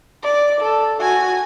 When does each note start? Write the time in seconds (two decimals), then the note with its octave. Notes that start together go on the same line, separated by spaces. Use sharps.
0.23 D5
0.60 A4
1.01 F#4 G#5